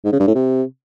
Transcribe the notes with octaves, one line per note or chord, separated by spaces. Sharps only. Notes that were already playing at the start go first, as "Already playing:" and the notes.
G#2
C#3
G2
A2
C3